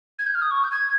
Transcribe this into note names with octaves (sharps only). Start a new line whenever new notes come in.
G#6
G6
F6
D#6
C#6
G6
G#6